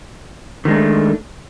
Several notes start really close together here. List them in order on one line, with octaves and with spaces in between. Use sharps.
D#3 G#3 D4 A3